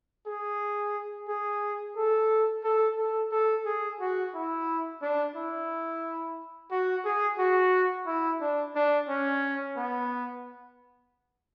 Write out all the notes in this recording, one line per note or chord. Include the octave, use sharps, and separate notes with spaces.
G#4
G#4
A4
A4
A4
A4
G#4
F#4
E4
D4
E4
F#4
G#4
F#4
E4
D4
D4
C#4
B3